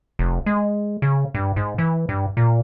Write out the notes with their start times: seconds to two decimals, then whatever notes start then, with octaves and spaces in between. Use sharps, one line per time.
0.19 F1
0.46 G#3
1.02 C#3
1.34 G2
1.56 G#2
1.78 E3
2.09 G2
2.37 A#2